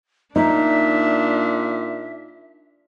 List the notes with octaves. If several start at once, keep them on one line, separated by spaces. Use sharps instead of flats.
A#2 D4 D#4 E5